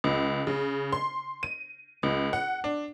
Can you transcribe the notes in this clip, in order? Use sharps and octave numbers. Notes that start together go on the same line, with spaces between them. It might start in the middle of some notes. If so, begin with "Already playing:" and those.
C#2
C#3
C6
D#7
C#2
F#5
D4